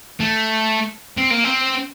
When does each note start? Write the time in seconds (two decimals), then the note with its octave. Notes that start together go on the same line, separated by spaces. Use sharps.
0.20 A3
1.17 C4
1.30 A#3
1.44 C4